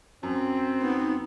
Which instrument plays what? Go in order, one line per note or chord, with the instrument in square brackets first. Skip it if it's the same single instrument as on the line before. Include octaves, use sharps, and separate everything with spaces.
[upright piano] F#2 [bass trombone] C4
[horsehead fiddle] B3 [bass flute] D#4